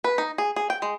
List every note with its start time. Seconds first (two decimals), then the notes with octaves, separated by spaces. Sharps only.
0.04 B4
0.18 D#4
0.38 G#4
0.56 G#4
0.70 G5
0.82 G#3